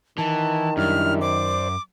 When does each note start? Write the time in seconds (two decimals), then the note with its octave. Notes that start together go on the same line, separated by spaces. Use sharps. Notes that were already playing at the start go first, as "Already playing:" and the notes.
0.18 D#3 E3 A5
0.77 F#2 G3 D4 E4 F6
1.21 C5 D5 D6